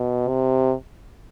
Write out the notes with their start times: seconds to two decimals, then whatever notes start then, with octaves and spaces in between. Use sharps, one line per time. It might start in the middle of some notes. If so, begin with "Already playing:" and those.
Already playing: B2
0.28 C3